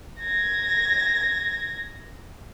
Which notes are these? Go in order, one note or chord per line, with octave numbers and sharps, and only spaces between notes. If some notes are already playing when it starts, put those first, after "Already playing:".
G#6 A#6